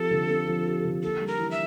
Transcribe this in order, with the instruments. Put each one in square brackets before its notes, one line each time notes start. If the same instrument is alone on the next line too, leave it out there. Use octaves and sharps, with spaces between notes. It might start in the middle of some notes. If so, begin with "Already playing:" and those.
Already playing: [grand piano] F3 C4 G4 [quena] A4
[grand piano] D3
C4
F3
G4
D3
[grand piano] A#3 [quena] A4
[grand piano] G3
[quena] A#4
[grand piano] E3
[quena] E5